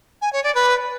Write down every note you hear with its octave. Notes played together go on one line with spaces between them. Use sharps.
G#5
C#5
D5
B4